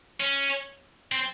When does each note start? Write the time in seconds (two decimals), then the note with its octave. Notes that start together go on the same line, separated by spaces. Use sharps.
0.20 C#4
1.12 C4